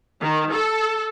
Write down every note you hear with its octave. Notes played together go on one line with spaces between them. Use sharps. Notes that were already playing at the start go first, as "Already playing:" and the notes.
D#3
A4